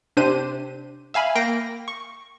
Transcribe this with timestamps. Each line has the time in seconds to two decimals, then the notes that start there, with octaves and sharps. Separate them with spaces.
0.17 C3 D4 G4 C5 D#7
1.14 E5 F5 G#5 B5
1.35 A#3 G5 A#6 C7 D7
1.88 C#6